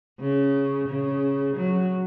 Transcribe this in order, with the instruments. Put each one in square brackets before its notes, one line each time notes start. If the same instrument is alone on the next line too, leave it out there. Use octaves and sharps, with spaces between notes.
[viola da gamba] C#3
C#3
F#3